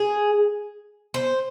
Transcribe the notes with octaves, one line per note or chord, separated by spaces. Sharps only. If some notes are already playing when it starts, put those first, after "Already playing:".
Already playing: G#4
C5